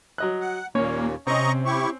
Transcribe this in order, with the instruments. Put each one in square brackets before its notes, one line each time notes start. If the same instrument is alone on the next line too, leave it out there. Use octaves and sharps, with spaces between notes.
[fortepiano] F#3 D#5 F#6
[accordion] F#5
[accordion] D#2 A#2 [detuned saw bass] A#3 [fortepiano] C#4 C#5
[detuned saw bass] C3 [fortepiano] C4 C#4 [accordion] D#5 A#5 C#6
[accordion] E4 G4 C#6